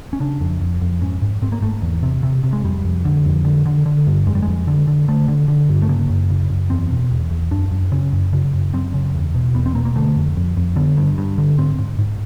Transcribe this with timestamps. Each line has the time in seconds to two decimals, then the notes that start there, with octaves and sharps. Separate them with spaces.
0.13 C#4
0.20 C#3 D4
0.41 F2
0.61 F2
0.81 F2
1.01 G#2 C#4
1.22 G#2
1.42 G#2 C4
1.52 A#3
1.62 G#2 A3
1.82 E2
2.03 C3
2.23 C3
2.44 C3
2.53 G#3
2.64 F2 G3
2.85 F2
3.05 D3
3.26 F2
3.45 D3
3.66 D3
3.86 D3
4.07 G2
4.26 F2 G#3
4.35 G3
4.42 F2 G#3
4.67 D3
4.88 D3
5.08 D3 A3
5.28 D3
5.48 D3
5.69 G2
5.82 A3
5.89 C#3 A#3
6.09 F#2
6.30 C#3
6.50 F#2
6.70 E2 C4
6.91 B2
7.12 E2
7.31 E2
7.51 F#2 D4
7.72 F#2
7.92 C#3 C#4
8.13 F#2
8.33 C#3
8.53 F#2
8.74 F#2 C4
8.94 C#3
9.15 E2
9.34 B2
9.54 E2 B3
9.66 C4
9.75 B2 A#3
9.85 A#3
9.96 D3 A3
10.16 F2
10.37 F2
10.57 F2
10.76 D3 B3
10.97 G2
11.18 G2
11.38 D3
11.58 G#2 C4
11.79 G#2
11.99 G#2